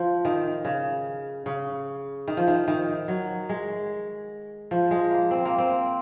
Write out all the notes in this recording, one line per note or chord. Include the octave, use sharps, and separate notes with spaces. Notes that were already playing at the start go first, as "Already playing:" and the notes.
Already playing: F3
D#3
C#3
C#3
D#3
F3
D#3
D#3
F#3
G#3
F3
G#3
A#3
C4
A#3
C4